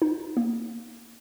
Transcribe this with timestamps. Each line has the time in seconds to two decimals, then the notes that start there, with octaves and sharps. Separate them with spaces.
0.02 D#4
0.37 A#3